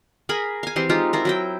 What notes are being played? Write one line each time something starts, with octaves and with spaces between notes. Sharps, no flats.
G#4 A#4 G#5 B5
F5 G#5
E3 C4 G4 C6
G#3 D#4 F4 G4
E4 F4 A#4
F#3 E4 G5